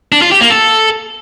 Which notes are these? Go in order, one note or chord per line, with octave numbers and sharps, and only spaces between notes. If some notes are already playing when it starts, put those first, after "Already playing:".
D4
F4
G4
A#3
A4